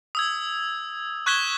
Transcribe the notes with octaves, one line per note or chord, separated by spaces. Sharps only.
D#6 E6 G#6
C#6 F#6 G#6 B6 E7 G7